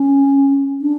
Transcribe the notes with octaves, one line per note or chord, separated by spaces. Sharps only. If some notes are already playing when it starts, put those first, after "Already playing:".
Already playing: C#4
D4